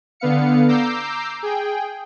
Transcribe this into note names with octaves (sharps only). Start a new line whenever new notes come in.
D3 B3 F5 C#7
A#5 D6 E6 G6 C7
G#4 G5